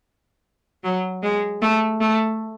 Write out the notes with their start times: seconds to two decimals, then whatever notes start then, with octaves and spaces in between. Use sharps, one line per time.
0.83 F#3
1.23 G#3
1.62 A3
2.01 A3